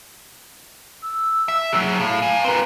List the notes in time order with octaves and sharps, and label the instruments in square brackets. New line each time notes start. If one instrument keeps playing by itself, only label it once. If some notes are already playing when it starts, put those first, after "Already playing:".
[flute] E6
[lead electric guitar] E5
F#3 G#4
[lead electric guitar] A2 [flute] F5
[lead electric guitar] A#4 G#5
[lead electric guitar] C4 A#4 [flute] B4